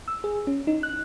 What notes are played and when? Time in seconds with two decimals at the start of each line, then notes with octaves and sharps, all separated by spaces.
0.08 E6
0.24 G#4
0.47 C#4
0.67 D#4
0.83 F#6